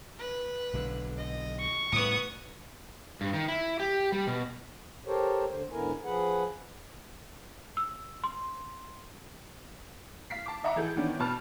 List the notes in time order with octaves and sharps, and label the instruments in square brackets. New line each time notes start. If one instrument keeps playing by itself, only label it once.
[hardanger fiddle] B4
[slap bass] B1 D3
[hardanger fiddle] D#5
[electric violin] C#6
[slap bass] A2 C#3 G3 [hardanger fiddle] B3 D#6
[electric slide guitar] G2
D#3
E4
G4
G3
B2
[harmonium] G4 A4 A#4 C5 C#5
D2 D3 C5
G#2 D3 B3 E4 A#4 G#5
F3 G#4 B4 F#5
[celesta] E6
C6
[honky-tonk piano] F5 B6 C7
A5 D6
D#5 E5 F#5 A#5 B5 D6
E3 G#4 A4 G6
D#3 E3 B3 C#4 D4
B2 B4 A5 F6